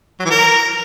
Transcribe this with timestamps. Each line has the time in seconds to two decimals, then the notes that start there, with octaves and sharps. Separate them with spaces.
0.20 F#3
0.25 E3
0.30 A#4